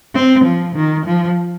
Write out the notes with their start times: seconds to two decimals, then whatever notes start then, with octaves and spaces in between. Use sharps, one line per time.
0.15 C4
0.45 F3
0.76 D#3
1.06 F3